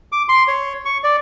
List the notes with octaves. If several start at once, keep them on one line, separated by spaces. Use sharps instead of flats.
D6
C6
C#5
C#6
D5